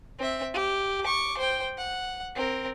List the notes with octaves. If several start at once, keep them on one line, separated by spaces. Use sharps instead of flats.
C4 E5
G4
C#6 D6
C5 G5
F#5
C4 A#4